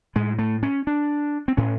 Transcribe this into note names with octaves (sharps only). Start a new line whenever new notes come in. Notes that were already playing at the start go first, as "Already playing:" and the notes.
A2 G#3
A3
C#4
D4
C4
A2 C#4